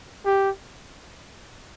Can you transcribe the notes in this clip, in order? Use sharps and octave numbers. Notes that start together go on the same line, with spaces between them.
G4